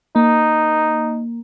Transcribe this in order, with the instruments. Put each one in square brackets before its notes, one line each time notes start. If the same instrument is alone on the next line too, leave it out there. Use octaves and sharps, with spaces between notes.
[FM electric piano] A#3 [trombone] D#4